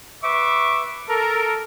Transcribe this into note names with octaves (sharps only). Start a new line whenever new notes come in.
B4 E5 C#6 D6
A4 A#4